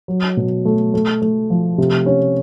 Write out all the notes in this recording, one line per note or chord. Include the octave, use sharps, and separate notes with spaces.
F#3
B2
A3
A3
A3
F3
C3
C#4